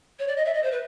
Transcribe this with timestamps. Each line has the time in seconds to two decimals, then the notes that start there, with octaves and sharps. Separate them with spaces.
0.19 C#5
0.28 D5
0.36 D#5
0.45 E5
0.54 D#5
0.63 C5
0.72 B4